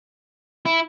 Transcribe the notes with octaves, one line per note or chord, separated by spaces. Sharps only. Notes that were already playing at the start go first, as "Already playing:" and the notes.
E4